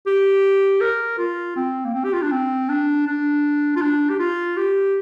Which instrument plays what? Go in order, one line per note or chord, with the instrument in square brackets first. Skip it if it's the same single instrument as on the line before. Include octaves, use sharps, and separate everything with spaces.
[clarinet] G4
A#4
F4
C4
A#3
C4
G4
F4
D4
C4
D4
D4
F4
D4
G4
F4
G4